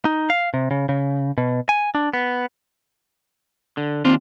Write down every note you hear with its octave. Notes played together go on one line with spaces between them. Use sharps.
D#4
F5
C3
C#3
C#3
B2
G#5
D4
B3
D3
D#2 C4 D4 F4